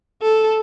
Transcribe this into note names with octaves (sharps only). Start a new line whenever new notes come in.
A4